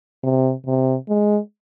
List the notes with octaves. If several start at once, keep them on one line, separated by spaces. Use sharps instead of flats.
C3
C3
G#3